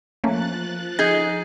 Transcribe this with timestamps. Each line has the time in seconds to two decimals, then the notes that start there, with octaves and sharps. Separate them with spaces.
0.24 F3 A3 A#3 C#4 F#6 A6
0.99 D#4 G#4 G6 G#6